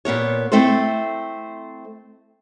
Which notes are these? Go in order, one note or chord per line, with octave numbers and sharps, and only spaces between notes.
A#2 B3 A#4 C#5
A3 C4 E4 A4 C5